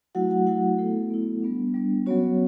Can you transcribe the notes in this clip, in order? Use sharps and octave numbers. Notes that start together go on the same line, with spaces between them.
F#3 A3 E4 F#4 F#5
F#4 F#5
F#3 A3 E4 F#4 F#5
A3 B3 E4 A4
B3 E4
G3 B3 D4
G3 B3 D4
F#3 B3 C#4 F#4 C#5